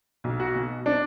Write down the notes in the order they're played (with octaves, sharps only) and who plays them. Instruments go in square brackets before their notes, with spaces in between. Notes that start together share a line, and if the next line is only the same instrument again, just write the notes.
[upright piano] B1
[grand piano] F#4
[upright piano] B2
[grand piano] D4